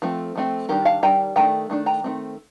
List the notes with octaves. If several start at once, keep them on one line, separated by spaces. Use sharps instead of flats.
F3 A3 C4
F3 A3 C4
D#3 G3 D4 G4 A#4
F5 A5
D#3 G3 D4 G5 A#5
D#3 A3 D4 G5 A#5
D#3 A3 D4
G5 A#5
D#3 A3 C4